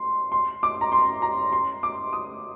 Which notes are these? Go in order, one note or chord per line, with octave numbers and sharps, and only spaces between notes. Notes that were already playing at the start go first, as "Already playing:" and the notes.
Already playing: C6
C6
D6
A#5
C6
A#5
C6
D6
D#6